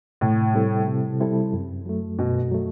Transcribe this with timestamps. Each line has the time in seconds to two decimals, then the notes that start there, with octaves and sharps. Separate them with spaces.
0.21 A2 C3
0.54 G3 C4 E4 A4
0.87 C3
1.20 G3 C4 E4 A4
1.53 F#2
1.86 F#3 A3
2.19 F#2 B2
2.51 F#3 A3